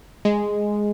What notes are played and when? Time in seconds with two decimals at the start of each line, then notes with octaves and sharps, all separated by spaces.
0.25 G#3